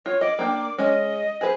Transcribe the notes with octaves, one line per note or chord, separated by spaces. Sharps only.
F4 C#5
D#5 D6
A#3 D4 G5
G#3 C#4 D#5
G#4 B4 C5